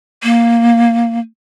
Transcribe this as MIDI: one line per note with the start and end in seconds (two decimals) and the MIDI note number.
0.23 1.19 58